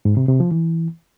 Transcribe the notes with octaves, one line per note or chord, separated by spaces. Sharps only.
G#2
C3
C3
F3
E3